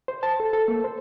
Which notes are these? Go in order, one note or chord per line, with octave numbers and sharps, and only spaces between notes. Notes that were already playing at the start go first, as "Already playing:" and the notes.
C5
A5
A4
A4
A#3
C5